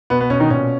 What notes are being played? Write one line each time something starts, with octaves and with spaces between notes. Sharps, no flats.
B2 B3
B3
B2 C#4
D#3 D#4
A#2 C#4